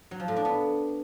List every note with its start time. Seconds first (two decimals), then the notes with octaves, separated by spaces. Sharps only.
0.11 F#3
0.20 F3
0.28 A2
0.36 D4
0.45 B3